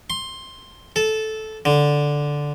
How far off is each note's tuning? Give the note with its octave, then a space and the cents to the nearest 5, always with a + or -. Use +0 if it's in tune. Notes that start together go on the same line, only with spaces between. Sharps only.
C6 +10
A4 -10
D3 -5